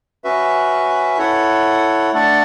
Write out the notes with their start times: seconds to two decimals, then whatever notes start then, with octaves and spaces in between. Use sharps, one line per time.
0.24 C#4 F#4 B4 E5
1.18 E4 A4 C#5 F#5
2.13 A3 D4 A4 D5 F#5